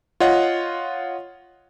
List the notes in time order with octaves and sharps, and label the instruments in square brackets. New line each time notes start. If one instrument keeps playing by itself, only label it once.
[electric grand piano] F4 C#5 D#5 F#5